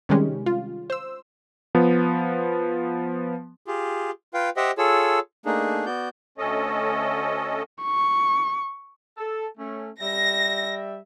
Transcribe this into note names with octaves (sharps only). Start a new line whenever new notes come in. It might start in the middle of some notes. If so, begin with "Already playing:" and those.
C3 D#3 G3 G#3 C#4 G4
F4
C5 E6
F3 B3
F4 G4 G#4
F4 B4 F5 G5
G4 C5 D#5 E5 F#5 G5
F4 G#4 A4 C#5 E6
A3 A#3 D4 D#4 G#4
B3 F#4 D5 G6
D2 C#4 A4 D#5
C#6
A4
A3 C#4
G3 E5 A#6